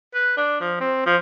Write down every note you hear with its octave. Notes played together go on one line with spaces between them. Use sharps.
B4
D4
F3
C4
F3